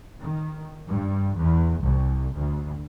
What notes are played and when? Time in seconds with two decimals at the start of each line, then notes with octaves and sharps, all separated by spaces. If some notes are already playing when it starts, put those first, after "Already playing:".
0.20 D#3
0.86 G2
1.34 E2
1.81 C2
2.33 D2